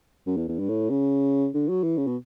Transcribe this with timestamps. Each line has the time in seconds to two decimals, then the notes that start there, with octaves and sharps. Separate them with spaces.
0.27 F#2
0.37 E2
0.48 E2
0.59 G2
0.69 A2
0.90 C#3
1.55 D3
1.69 F#3
1.83 E3
1.97 C#3
2.07 B2